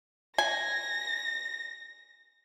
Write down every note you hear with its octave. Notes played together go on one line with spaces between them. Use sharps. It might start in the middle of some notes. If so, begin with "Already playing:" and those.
G#5 A#6